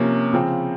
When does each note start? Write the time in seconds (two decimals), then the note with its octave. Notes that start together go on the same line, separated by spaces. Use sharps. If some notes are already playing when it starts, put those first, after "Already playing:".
Already playing: C3 F3 A#3 C#4
0.33 C#3 F3 C4